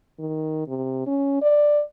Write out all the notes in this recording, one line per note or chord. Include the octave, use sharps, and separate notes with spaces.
D#3
C3
C#4
D5